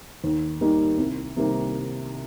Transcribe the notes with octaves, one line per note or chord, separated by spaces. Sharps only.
D#2
D#3 G3 A#3 D#4
C2
C3 D#3 G3 A#3